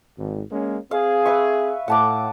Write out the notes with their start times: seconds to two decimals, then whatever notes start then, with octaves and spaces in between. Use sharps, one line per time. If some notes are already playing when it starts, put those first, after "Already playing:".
0.18 G#1
0.51 G#3 A#3 C#4
0.91 C4 G#4 F5
1.25 B4 E5 C#6
1.88 A2 F#5 A5 D6